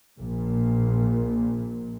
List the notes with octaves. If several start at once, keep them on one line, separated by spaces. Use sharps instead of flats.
A#1 A#2